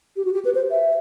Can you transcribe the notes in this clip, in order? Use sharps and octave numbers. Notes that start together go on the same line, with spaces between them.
G4
F#4
G4
B4
C5
E5